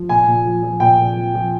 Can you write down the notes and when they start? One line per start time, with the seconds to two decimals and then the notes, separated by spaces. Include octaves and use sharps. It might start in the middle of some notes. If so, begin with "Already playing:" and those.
Already playing: F3
0.09 A#2 G#5
0.27 A#2
0.46 F3
0.63 F3
0.80 A#2 G5
0.99 A#2
1.16 F3
1.34 F3